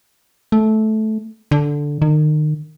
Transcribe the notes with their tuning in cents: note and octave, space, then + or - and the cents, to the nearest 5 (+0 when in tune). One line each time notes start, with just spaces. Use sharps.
A3 -15
D3 -5
D#3 -35